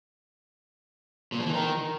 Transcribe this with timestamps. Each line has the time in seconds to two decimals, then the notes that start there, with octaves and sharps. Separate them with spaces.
1.32 A#2
1.39 F3
1.46 E3
1.54 D#3